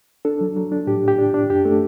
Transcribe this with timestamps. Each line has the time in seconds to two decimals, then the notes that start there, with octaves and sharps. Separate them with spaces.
0.25 D4 A4
0.41 F#3
0.56 F#3
0.72 D4
0.87 A2 G4
1.03 A2 G4
1.18 D4
1.34 D4
1.50 F#2 G4
1.65 A3 A4